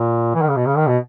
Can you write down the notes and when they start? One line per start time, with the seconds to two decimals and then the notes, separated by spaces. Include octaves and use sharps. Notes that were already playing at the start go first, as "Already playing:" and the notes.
Already playing: A#2
0.35 E3
0.42 D#3
0.49 C#3
0.56 B2
0.66 C#3
0.77 D#3
0.87 B2